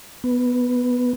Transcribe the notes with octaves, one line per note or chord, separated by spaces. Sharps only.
B3